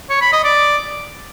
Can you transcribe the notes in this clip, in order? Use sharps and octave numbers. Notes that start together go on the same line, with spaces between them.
C#5
B5
D#5
D5